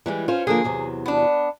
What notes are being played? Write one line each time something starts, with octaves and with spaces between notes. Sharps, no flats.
E3 G3 G#3
C#4 F4 C5
D3 F3 A#3 G#4
E2 C3 F#3
B3 D4